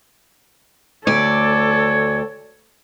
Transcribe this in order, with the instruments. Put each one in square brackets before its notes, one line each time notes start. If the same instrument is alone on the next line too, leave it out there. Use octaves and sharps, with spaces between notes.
[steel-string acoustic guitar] D2 D5 [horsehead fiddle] A4 [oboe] C#5